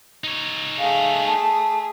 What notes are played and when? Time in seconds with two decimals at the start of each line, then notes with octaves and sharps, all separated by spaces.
0.24 D#4 C#5
0.79 A3 G#4 F5
1.27 A5